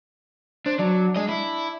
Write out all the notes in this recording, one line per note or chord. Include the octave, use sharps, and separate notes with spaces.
D4 C5
F#3 D4
G#3 D4 D#5
E4